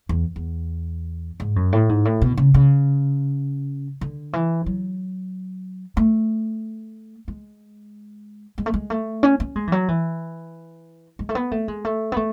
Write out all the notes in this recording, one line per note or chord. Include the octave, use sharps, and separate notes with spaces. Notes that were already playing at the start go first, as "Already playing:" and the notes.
E2
E2
G#2
F#2
A2
G#2
A2
B2
C#3
C#3
D3
E3
F#3
A3
G#3
G#3
A3
G#3
A3
C#4
C#4
G#3
E3
F#3
E3
G#3
A3
B3
A3
G#3
A3
B3
A3